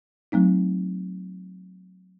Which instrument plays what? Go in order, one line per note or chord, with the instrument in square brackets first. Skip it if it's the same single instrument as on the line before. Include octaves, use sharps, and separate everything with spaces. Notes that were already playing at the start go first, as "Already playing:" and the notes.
[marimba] F#3 A3 C4 D#4